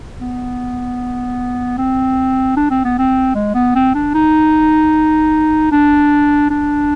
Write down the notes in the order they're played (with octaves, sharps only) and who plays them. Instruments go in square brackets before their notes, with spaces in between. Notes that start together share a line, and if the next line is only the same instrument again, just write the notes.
[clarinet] B3
C4
D4
C4
B3
C4
G#3
B3
C4
D4
D#4
D4
D4